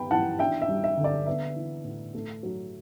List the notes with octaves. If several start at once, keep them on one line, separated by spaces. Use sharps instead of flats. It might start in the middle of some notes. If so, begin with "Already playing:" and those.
Already playing: B3 G5 B5
E3 F#5 A5
D4 E5 G5
E5
G3
E5
D3
D5
B3 E5
E3
A2
A3
F#3